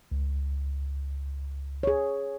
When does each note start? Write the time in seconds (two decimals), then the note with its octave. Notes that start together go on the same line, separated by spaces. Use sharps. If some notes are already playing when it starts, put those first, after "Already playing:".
0.12 C#2
1.83 G#4 C#5